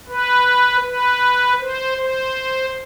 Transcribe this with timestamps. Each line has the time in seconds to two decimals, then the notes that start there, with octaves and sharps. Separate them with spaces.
0.09 B4
0.85 B4
1.60 C5
1.98 C5